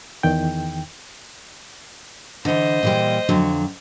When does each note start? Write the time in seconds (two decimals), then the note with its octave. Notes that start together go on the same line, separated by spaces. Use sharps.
0.23 E2 D#3 G5
2.45 D3 E3 C5 D#5
2.83 A#2 E3 G3
3.29 F2 D3 F#3